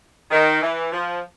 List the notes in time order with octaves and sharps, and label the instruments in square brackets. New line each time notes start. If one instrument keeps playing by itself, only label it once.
[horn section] D#3
E3
F3